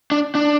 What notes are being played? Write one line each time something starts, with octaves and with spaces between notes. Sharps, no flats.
D4
D4